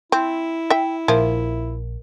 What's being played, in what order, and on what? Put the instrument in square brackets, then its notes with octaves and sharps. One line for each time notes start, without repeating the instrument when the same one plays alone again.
[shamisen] C4 [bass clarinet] E4
[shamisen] E5 G5
[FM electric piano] A#1 [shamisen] F3 [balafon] A#4 E5